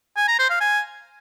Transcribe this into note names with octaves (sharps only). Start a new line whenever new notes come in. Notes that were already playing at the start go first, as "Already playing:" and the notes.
G#5
A#5
C5
F5
G#5